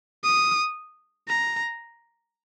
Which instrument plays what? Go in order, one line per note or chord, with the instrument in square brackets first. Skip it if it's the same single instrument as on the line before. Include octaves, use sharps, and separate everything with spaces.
[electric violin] D#6
A#5